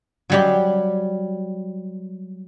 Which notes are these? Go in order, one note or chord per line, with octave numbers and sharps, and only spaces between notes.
F#3 G3 G4